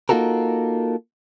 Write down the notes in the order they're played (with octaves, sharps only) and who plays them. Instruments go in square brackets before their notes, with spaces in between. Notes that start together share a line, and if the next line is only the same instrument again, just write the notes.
[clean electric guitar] A#3 D#4 F4 F#4 A4 A#4